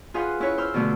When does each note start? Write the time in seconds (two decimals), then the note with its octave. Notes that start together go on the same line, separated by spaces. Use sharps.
0.14 F4 G#4 B4 C5 F5 F#5
0.40 C#4 E4 B4 C#5
0.58 C5 C6 E6 F6
0.74 B2 D3 A3